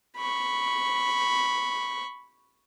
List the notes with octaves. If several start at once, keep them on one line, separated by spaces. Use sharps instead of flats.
B5 C#6